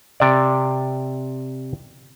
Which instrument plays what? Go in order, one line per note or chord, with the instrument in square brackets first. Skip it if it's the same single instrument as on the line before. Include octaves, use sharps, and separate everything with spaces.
[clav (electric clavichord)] C3 D5